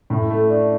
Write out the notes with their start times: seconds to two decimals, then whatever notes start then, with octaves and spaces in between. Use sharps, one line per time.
0.10 A2
0.30 A3
0.50 D4